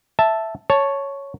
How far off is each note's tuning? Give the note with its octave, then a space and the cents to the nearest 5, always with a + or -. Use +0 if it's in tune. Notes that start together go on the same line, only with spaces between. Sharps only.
E5 +0 A5 +0
C#5 +0 A5 +0